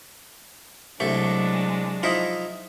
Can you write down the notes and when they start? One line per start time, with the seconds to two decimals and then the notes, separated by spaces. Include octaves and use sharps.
1.00 C2 F#3 G#3 A3 D4
2.03 F3 D#4 E4